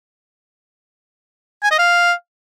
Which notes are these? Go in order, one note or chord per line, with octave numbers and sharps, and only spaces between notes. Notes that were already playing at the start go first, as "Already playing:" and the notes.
G#5
D#5
F5